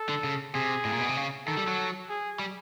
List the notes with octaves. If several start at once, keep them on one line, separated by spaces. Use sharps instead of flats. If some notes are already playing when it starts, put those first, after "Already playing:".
Already playing: A4
D3
C#3
C3 G#4
A2
A#2
B2
C3
C#3
D#3 A4
G3
F#3
G#4
G3